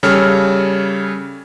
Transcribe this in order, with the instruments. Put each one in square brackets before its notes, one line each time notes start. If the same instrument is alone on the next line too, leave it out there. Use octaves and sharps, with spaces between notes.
[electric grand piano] C#3 G3 A4 C#5 F6